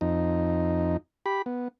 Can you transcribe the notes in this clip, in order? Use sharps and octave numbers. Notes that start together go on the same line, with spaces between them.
F2 D#4
G4 B5
B3